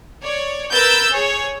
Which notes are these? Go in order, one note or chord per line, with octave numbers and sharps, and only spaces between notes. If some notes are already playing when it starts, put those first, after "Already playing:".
C#5 D5
A#4 B4 E6 G6 A6
G#4 C#5